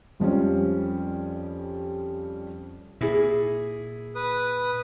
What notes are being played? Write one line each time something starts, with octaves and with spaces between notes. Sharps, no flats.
F2 F3 G3 C#4
A#2 E4 G#4
B4 D#6